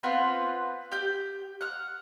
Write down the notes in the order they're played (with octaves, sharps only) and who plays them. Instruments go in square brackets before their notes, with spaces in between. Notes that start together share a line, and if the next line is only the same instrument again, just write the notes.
[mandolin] B3 C4 F4 B4
G4 G6
F#5 F6